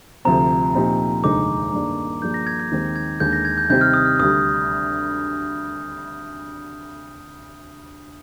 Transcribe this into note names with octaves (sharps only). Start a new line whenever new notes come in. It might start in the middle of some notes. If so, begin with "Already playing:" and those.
D2 C3 F3 C4 A#5
A#2 F3 C4 D#4 G4
F1 D#2 D3 G#3 D#4 D6
G2 D#3 A#3 D4 G#4
G2 F3 A#3 D4 G#4 G6
A#6
G#6
G#6
D#2 D#3 G#3 C4
G#6
D#2 D3 G#3 G6
A#6
G#6
G6
C3 D#3 G3 C4 G4 G6
F6
D#6
F6
D2 D3 G3 D#6